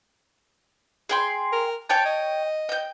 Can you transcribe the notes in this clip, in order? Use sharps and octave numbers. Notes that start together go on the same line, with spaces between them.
G#4 G5 C6
A#4
C#5 G5 A5 G6
D#5
G5 G6